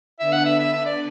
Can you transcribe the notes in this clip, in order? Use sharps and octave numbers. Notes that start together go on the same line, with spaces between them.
D3 B3 D4 B4 E5
F#5
E5
E5
E5
D5